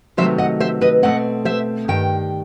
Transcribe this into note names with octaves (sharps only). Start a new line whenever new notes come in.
C3 D#3 F#3 A3 C5 E5
D#5 F#5
C5 E5
B4 D#5
F#3 A3 C4 D#5 F#5
B2
C5 E5
G2 D#3 G5